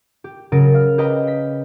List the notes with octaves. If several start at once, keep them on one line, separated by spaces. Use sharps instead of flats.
G4
C#3 F#3 A#4 A6 D7 D#7
F5 F6
G4 B4 D#5 G5 A#5
B6